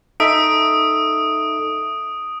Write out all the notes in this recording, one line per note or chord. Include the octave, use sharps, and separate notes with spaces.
D#4 A4 E5 D#6 D7